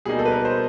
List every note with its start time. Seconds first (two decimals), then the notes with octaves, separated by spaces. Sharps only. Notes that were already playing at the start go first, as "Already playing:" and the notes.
0.05 B2 G3 A#3 D#4 G#4
0.19 A4
0.26 B4
0.31 A#4
0.45 C5